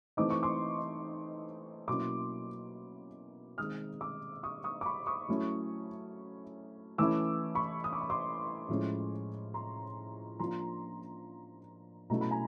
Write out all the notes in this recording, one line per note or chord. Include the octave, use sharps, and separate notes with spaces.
E3 A3 C4 D#4 D6
C#6
C6 D6
B2 F#3 A#3 C#4 E4 C6 D6
D#3 G#3 C4 D#6 F6
D6 E6
C#6 D#6
C#6 D#6
D6
B5 C#6
C#6 D#6
F#3 A3 C#4 E4
E3 A3 C#4 E4 D6 E6
B5 C#6
D#6
D6
C#6
C6 D6
A2 F3 G#3 C#4 E4
A#5 C6
F3 A#3 D4 F4 A#5 C6
B2 F#3 A3 C#4 E4 A#5
B5
G#5 A#5